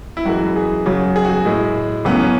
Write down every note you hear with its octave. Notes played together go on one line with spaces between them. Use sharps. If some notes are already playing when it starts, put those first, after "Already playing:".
E4
F#2 E3 G#3 F#4
G#4
F#2 C#3 F#3
G#4
F#4
G#4
A2 G#3
F#2 C#3 E3 A3 B3
C#4